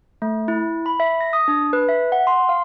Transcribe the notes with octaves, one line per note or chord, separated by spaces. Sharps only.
A3
E4
B5
E5
A#6
D#6
D4
B4
E5
F#5
C6
F5